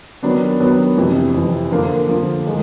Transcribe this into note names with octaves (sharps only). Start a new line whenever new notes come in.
D#3 F#3 B3 D4
D#3 F#3 B3 D4
F2 C3 E3
F2 C3 E3
D3 F3 A#3
D3 F3 A#3
D#3 G#3